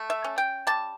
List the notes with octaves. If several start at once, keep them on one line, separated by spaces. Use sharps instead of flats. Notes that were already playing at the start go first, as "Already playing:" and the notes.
Already playing: A3
E5
C#4
G5
G3 A5